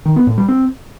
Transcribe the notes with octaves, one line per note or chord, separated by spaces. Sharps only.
D#3
B3
A2
G3
C4